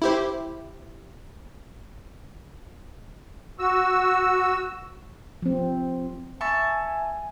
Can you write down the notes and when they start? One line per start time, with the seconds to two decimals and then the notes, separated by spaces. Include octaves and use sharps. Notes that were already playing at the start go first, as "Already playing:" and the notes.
0.02 E4 G4 C5
3.59 F#4 E6
5.42 F3 C4
6.41 E5 G#5 A5 C#6